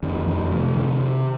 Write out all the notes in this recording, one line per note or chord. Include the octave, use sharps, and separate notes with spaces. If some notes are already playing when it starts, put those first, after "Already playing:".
F2 D#3
F2 D#3
C3 F3
C3 D#3